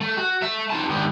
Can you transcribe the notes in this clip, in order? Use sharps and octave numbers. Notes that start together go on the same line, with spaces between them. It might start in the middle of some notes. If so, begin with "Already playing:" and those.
A3
F#4
A3 E5
D#4 F4 A5
G#2 D#3 B3 D4 G4